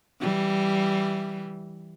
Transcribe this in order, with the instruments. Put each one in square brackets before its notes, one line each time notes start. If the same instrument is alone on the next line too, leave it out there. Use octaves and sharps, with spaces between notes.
[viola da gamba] E3 G3